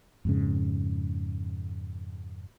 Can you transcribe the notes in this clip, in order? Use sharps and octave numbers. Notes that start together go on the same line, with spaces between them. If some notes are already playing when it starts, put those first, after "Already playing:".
F2 G#2 C#3